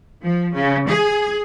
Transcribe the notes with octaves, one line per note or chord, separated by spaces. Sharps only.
F3
C#3
G#4